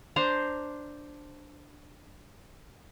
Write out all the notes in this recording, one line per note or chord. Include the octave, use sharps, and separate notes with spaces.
D4 C5 A#5